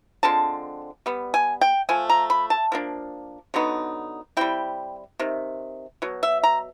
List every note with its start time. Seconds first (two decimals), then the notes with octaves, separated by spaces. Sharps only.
0.23 D3 F3 G#3 C4 A5
1.06 G3 B3
1.34 G#5
1.61 G5
1.89 F3 A3 G#5
2.10 A#5
2.30 B5
2.50 A5
2.72 F3 A#3 D4
3.54 D3 F#3 B3 D#4
4.37 G3 C4 E4 G5
5.20 C3 D#3
6.02 B2 F#3
6.23 E5
6.44 A#5